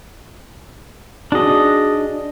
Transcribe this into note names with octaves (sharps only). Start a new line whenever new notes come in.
D4 D#4 F#4 G#4 D#5